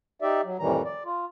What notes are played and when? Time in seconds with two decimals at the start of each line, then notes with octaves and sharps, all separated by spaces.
0.22 D#4 G4 D5 E5
0.44 F#3
0.59 F2 A2 D#3 E3 G3 A#5
0.85 D5
1.05 F4